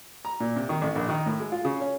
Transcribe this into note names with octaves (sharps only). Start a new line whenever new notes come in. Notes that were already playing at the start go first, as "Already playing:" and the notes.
A#5
A#2
C3
D#3
A1
A#1
D#3
A2
G#3
F4
C#3
C#4